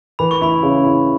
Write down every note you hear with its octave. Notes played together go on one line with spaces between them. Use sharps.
E3 B5
C#6
E4 B5
C#3
E4